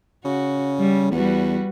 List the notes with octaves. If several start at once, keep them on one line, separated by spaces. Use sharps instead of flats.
C#3 F#4
G3
E2 G3 F#4 B4